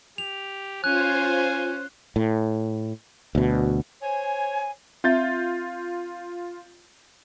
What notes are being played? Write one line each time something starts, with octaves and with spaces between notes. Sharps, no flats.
G4 F7
C#4 F4 C5 G#5 F#6
A2
D2 B2
C5 C#5 G#5
C4 F4 E5 G6 A6